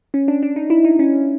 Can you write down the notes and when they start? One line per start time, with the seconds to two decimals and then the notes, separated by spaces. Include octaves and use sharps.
0.14 C#4
0.28 D4
0.43 D4
0.56 D#4
0.70 E4
0.85 D#4
0.99 C#4